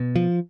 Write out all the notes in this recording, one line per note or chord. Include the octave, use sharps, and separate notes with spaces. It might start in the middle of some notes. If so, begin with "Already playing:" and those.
Already playing: B2
F3